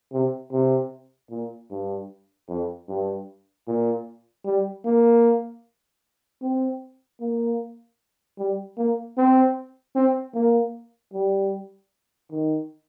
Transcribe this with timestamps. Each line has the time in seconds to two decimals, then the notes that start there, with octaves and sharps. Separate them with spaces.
0.13 C3
0.52 C3
1.30 A#2
1.71 G2
2.49 F2
2.88 G2
3.67 A#2
4.45 G3
4.85 A#3
6.42 C4
7.21 A#3
8.38 G3
8.78 A#3
9.17 C4
9.95 C4
10.35 A#3
11.13 G3
12.32 D#3